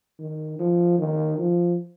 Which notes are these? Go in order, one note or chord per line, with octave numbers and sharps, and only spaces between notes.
D#3
F3
D#3
F3